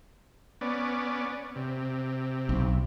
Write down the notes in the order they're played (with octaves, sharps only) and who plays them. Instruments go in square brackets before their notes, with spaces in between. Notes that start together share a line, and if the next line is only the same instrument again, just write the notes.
[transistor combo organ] B3 C#4 D5
C3
[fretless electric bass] B1